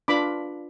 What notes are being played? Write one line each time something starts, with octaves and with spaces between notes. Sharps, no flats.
D4 F4 B4 B5 D6